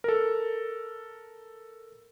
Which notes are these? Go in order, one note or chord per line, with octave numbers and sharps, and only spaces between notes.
A4 A#4